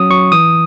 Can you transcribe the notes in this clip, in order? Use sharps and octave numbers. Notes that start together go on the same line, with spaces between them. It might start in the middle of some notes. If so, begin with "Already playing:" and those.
Already playing: F#3 C#4 D#6
F#3 C#6
E3 D#6